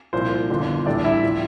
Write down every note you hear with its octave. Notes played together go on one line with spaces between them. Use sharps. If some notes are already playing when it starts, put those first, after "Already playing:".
C2 A#2 F3 C5
G1 F2 D3 F3
A1 A2 G3 D4 D5
E4 E5
A2 F3